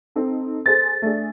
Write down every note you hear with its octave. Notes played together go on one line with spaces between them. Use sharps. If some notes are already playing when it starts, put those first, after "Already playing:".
C4 D#4 A4
G#4 A4 C5 A6
A3 D4 G#4